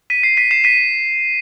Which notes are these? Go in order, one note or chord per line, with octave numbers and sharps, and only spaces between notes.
B6 D#7
C7
B6 D#7
C7 E7
B6 D#7